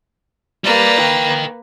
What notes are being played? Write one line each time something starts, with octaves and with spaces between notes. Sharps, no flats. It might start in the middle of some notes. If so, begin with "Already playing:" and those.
G3 A#3 B4 D5
A#4 G5